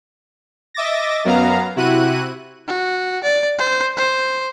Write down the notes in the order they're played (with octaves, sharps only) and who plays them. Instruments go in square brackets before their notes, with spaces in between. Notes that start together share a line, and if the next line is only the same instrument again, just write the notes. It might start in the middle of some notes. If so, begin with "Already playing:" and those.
[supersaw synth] D#5 E5 D6 A6 A#6
F#2 F#3 B3 F5 A#5
C3 E4 F#4 F#6 D#7
[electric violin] F#4
D5
C5
C5